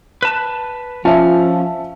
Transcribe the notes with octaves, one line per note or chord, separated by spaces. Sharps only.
B4 A5
F3 C#4 F4 E5 A5